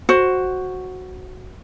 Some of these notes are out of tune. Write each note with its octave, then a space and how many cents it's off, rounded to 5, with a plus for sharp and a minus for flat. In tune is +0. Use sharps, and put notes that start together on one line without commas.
F#4 +0 C5 +15